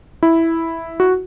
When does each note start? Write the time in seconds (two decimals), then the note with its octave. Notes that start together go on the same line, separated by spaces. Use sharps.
0.23 E4
1.00 F#4